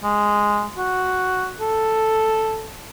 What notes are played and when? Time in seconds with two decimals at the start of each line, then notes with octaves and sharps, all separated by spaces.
0.04 G#3
0.78 F#4
1.61 A4